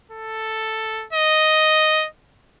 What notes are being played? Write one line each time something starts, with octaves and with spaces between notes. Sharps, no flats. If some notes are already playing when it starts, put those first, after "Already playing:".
A4
D#5